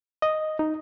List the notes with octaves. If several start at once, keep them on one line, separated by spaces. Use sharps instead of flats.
D#5
D#4